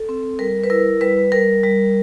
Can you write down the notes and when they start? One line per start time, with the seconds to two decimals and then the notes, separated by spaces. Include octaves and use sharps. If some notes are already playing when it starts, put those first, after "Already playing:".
Already playing: A4
0.09 C4
0.39 G3 A#4
0.64 B4
0.70 E4 A#4
1.01 G3 B4
1.32 G3 A#4
1.64 G3